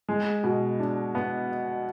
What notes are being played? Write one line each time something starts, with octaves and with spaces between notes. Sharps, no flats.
G#3
B2
D4
B3